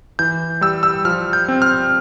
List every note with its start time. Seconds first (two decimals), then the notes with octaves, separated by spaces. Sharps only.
0.19 E3 G6
0.61 G3 E6
0.83 E6
1.05 F3 F6
1.33 G6
1.48 C4
1.62 F6